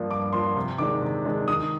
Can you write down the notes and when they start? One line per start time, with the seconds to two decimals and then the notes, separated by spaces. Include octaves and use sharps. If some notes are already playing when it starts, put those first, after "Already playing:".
Already playing: G2 F3 A#3 D4
0.10 G2 D6
0.33 F3 A#3 D4 C6
0.56 C3
0.78 D#3 G#3 D4 D6
1.01 C3
1.25 D#3 G#3 D4
1.48 D#3 D#6